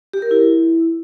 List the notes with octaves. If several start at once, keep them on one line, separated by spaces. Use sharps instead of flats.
G4
A#4
E4